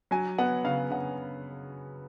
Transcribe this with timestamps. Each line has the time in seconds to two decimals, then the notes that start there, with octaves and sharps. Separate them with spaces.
0.11 F#3 G#5
0.38 B3 F#5
0.64 C#3 F5
0.91 C#3 F#5